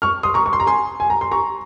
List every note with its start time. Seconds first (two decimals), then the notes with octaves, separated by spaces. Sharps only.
0.02 C#6 F6
0.23 C6 D#6
0.34 A#5 C#6
0.46 C#6
0.53 C6
0.60 A#5
0.67 G#5 C6
1.00 G#5
1.10 A#5
1.21 C6
1.31 A#5 C#6